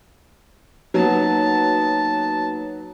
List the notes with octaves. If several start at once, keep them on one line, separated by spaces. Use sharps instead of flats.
F#3 A#3 B3 D#4 A5